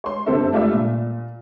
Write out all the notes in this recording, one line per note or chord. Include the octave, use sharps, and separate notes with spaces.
C#5 C6
F#1 G2 D3 C4 A4 E5
G3 A3 F4 D5 E5
A#2